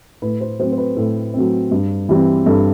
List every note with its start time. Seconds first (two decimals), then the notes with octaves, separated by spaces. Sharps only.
0.22 A2 B4
0.41 C5
0.59 F#3 A3 C4 C5
0.72 C5
0.78 B4
0.96 A2 A4
1.34 F#3 A3 C4
1.71 G2
2.09 E3 G3 C4
2.46 G2 A4